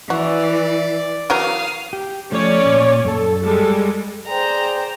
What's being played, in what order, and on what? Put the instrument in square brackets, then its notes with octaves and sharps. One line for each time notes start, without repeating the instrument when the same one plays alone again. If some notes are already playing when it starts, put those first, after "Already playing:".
[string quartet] E3 [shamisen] F#4 [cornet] D5
[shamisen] E3 F#3 A#4 [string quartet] F5 D#6
[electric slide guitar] G4
[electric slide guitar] F3 A3 [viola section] C#4 C#5 D5
[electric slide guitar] A#2
[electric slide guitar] F#2 A5 [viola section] A4
[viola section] G3 G#3 A4
[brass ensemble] G#4 D5 G5 [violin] C5 A#5